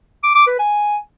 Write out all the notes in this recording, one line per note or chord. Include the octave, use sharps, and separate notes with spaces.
D6
D6
B4
G#5